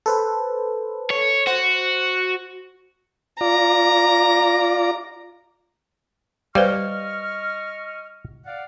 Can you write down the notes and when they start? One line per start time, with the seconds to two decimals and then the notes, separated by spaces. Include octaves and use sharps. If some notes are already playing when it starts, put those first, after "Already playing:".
0.06 A4 B4 C5
1.10 C#5
1.47 F#4 C5
3.41 F4 D5 A#5
6.55 G3 B4 C5 D#5 F5 C#6 F6
8.46 D5 F5 F#5